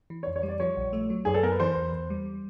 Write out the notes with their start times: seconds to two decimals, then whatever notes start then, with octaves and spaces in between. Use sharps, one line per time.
0.10 E3
0.23 C#5
0.27 F2
0.36 C#5
0.43 G3
0.48 D5
0.60 F3 C#5
0.77 A#1
0.93 A3
1.10 F#3
1.25 F#2 G#4
1.34 A4
1.43 B3 A#4
1.52 B4
1.60 E3 C5
1.77 E2
1.93 E2
2.10 G3